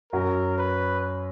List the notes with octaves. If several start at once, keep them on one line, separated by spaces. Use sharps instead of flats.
F#2 F#3 A#4
B4